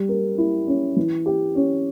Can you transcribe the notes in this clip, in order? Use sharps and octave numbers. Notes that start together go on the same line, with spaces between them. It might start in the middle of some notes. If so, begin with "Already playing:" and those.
Already playing: G3
A#4
E4
C#4
E3
G4
C#4